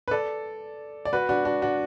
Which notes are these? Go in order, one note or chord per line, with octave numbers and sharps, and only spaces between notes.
B4
A4 D5
D5
F#4 B4
D4 F#4
D4 F#4
D4 F#4